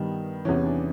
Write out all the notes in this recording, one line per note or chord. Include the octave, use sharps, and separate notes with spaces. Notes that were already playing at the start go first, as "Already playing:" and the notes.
Already playing: G2 D#3 G3 B3
E2 C3 E3 C#4
D4